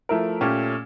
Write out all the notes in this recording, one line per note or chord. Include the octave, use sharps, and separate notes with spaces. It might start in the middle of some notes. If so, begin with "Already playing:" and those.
F3 A3 E4 A#4
A#2 A3 C#4 G4